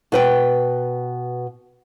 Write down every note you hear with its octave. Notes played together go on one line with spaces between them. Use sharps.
B2 B4 G5